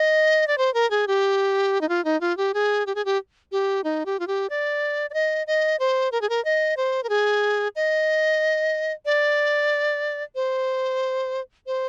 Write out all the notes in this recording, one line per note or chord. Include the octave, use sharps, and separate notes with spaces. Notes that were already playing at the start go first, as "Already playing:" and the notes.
Already playing: D#5
D5
C5
A#4
G#4
G4
D#4
F4
D#4
F4
G4
G#4
G4
G#4
G4
G4
D#4
G4
F4
G4
D5
D5
D#5
D#5
C5
A#4
G#4
A#4
D#5
C5
A#4
G#4
D#5
D5
C5
C5